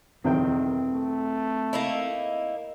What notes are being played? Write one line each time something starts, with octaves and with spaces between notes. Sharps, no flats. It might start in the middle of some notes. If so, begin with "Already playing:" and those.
B1 E2 D#3 C4 G5
A3
A#3 D#4 E4